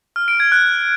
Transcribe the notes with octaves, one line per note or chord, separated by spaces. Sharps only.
F6
D7
G#6
F#6